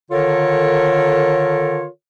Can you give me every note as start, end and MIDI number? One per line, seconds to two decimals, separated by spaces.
0.11 1.86 50
0.11 1.86 51
0.11 1.86 65
0.11 1.86 69
0.11 1.86 70
0.11 1.86 73